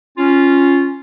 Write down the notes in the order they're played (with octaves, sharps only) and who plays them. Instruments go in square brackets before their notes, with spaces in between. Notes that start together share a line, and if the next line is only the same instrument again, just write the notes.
[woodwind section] C#4 F4